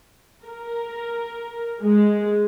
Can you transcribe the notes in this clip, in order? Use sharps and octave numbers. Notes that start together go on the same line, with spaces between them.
A#4
G#3